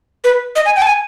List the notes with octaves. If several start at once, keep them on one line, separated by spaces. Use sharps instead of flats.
B4
D#5
G#5
G5
A5
G#5